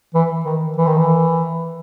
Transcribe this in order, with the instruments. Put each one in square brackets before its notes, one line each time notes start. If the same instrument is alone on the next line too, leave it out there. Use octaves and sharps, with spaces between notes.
[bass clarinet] E3
D#3
E3
D#3
E3